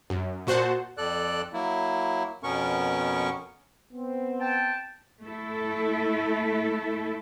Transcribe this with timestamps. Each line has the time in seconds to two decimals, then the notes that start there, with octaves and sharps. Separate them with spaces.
0.10 F#2
0.47 A#2 F#4 C5 F#5 A5
0.97 F2 A4 D5 F#6
1.53 F#3 A#3 E4
2.43 F2 B2 B3 C#4 A#4 C#6
3.93 B3 C4
4.40 G5 A5
5.22 A3 E4 A4